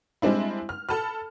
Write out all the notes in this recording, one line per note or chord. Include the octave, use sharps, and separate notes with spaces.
G3 G#3 C4 D4 E4
F6
A4 A5 B5 F6